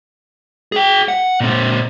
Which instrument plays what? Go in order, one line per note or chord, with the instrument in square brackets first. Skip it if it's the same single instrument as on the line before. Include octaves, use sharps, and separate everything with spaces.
[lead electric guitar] G#4 G5
F#5
A#2 C4